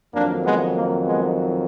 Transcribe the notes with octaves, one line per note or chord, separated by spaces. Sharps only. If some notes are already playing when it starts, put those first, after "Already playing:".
F2 D#3 F#3 A#3 D4
G#3 B3
A#3
G#3 B3